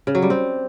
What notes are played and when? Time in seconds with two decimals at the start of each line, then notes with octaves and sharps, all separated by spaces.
0.07 C#3
0.15 F#3
0.22 G3
0.30 C4